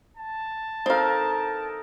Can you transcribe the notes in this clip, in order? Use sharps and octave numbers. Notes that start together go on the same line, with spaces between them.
A5
C4 D#4 A4 A#4 F5